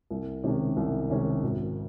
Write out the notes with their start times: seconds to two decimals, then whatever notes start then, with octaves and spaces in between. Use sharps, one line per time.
0.11 C2
0.44 C3 D#3 G#3 C#4
0.77 C2
1.10 C3 D#3 G#3 C#4
1.43 G#1